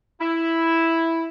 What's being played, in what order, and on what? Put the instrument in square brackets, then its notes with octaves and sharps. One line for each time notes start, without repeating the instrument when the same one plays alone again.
[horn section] E4